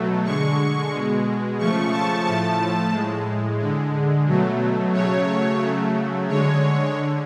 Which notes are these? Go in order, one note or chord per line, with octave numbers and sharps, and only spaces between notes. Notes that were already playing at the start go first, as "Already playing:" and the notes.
Already playing: B2 F#3 A3
D3 G#3 C#6
B2 G#3
C#3 F3 A3 C#6
A5
A2 F3 A3 A5
A2 G#3
D3 G#3
B2 F#3 A3
C#3 F#3 A3 C#5
C#3 F#3 A3
D3 G#3 C#5
D3